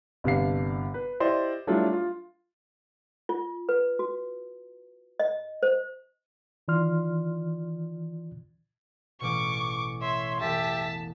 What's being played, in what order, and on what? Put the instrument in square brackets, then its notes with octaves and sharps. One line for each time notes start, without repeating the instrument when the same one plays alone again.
[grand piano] G1 C3 D4 F5 C7
B4
E4 G4 C5 D5 D#5
F#3 G3 A3 D4 E4 F4
F4
[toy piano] F4
B4
F#4
D#5
C5
[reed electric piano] D#3 E3 F4 D5 C6 F6
[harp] A1 B2 [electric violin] C#6 D6
[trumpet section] C#5 C6 [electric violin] E5
[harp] E1 A6 E7 [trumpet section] G4 E5 [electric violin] A5 B6